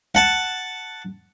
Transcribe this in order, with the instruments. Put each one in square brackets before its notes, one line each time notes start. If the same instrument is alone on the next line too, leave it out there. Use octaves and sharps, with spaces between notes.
[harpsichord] F#5 A5